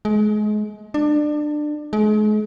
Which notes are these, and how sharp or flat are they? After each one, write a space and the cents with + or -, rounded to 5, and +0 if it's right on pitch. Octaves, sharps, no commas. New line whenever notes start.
G#3 +30
D4 +25
G#3 +40